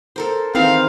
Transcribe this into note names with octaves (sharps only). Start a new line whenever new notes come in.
A4 A#4 C5
D#3 E3 C4 G#4 F5